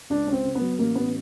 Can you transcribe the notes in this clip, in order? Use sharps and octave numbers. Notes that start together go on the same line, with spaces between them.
C#2 D4
C#2 C#4
C4
C#3
B3
F#3
A1 A#3
A1 B3